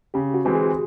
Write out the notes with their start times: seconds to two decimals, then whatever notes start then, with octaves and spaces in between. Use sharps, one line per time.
0.14 C#3 G4
0.34 F#4
0.45 E3 G#3 C4
0.55 G#4